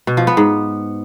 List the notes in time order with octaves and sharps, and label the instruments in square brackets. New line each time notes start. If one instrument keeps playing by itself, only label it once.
[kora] B2
F3
B3
G#2